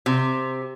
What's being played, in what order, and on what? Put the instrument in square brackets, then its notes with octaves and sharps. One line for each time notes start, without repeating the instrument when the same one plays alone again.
[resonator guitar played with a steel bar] C3